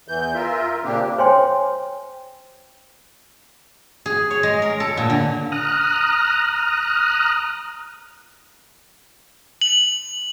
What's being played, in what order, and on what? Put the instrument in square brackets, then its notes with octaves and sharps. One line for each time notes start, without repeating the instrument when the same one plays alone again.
[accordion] E2 E3 G6
F4 A#4 E5
A#2 C#3 A#3 C4 D4 G4
[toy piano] C5 C#5 G5 G#5 C6
[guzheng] G#4
C#5
G#3
A#4
A4
A#2
D3
[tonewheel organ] A#5 D#6 F6 F#6
[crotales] F#7